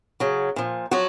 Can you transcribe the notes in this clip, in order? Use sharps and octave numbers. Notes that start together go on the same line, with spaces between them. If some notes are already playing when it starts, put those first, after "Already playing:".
C#3 F#3
A#2 F3
F3 F#3 F#4